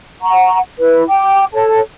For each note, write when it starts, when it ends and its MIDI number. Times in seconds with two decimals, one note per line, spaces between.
0.22 0.58 78
0.22 0.58 82
0.22 0.58 85
0.78 1.03 64
0.78 1.03 71
1.08 1.44 79
1.08 1.44 86
1.53 1.79 69
1.53 1.79 73
1.53 1.79 81